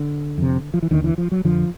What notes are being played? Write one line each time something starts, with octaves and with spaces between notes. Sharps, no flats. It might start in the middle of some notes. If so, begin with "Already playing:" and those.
Already playing: D3
F2 C3
F3
E3
D#2 D3 D#3
E3
F3
F#3
F2 D3 F3